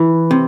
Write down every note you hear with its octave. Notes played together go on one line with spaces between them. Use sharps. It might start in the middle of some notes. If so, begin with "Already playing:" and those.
Already playing: E3
C3